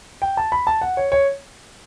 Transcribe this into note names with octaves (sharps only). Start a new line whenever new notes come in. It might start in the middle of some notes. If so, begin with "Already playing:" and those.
G5
A5
B5
A5
F#5
C#5
C#5